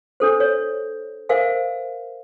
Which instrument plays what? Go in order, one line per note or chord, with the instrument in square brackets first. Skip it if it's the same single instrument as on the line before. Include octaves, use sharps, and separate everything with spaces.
[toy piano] D4 A4 C5
C#5
A#4 C5 E5 F5 G#5